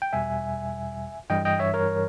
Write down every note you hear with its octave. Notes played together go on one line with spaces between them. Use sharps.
G5
E2 B2 G3 E5 G#5
G2 E3 G3 D#5 G5
D#5 G5
C#5 E5
A#4 C#5